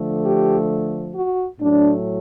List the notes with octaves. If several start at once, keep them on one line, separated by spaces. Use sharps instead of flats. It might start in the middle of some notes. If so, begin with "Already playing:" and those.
Already playing: D3 F3 A3
G4
F#4
A2 F#3 A3 D4